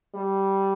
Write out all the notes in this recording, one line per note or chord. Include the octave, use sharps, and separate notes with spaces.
G3